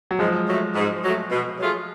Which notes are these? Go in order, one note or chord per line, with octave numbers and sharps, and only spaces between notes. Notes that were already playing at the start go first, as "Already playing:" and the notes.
F#3
G#2 F3 G#3
F#3 A3
G#2
F#3 A3
B2
F#3 A3 F4 G#4